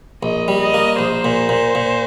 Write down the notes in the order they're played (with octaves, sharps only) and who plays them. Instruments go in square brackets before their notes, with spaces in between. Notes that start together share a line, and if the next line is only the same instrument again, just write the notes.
[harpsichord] A#1 [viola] D#5
[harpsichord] G3
[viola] D#5
[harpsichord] A#3
[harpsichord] A#1 [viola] C5
[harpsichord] A#2
A#2
A#2